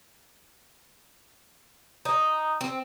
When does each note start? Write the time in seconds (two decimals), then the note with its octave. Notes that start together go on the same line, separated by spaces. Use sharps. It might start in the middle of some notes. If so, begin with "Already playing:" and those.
2.05 D#4
2.61 C4